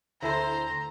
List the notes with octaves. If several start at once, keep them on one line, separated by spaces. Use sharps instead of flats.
D2 E4 A4 C5 A#5 C6